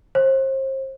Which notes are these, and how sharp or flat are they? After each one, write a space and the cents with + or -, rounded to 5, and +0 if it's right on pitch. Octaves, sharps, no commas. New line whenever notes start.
C5 +35